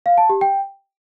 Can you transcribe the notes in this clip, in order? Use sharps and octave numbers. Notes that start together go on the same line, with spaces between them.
F5
A5
G4
G5